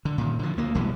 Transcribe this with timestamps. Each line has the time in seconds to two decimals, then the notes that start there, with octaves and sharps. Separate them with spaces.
0.05 D3
0.18 A#2 D#3
0.39 D3 F3
0.57 D2 A#3
0.75 A#1 B2 E3 G3